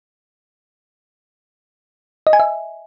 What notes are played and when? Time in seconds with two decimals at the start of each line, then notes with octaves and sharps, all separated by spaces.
2.27 D#5
2.33 G#5
2.40 E5